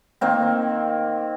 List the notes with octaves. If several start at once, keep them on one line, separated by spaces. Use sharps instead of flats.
D#3 A#3 C4